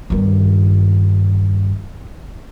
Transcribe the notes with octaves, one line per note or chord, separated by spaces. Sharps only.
G2 D#3